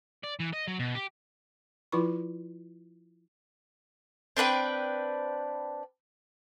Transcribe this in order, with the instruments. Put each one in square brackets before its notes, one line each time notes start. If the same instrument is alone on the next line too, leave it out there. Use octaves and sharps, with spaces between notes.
[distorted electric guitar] D5
E3
D#5
F#3
B2
G4
[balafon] F3 E4 F4 B4 B5 C#6
[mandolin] C4 D4 B4 G5